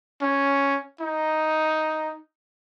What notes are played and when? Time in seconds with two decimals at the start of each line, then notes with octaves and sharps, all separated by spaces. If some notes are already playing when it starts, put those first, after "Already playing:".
0.21 C#4
1.01 D#4